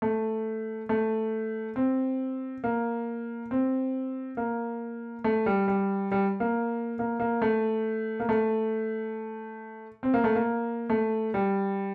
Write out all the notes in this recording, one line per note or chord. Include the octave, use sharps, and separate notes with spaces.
A3
A3
C4
A#3
C4
A#3
A3
G3
G3
G3
A#3
A#3
A#3
A3
A#3
A3
C4
A#3
A3
A#3
A3
G3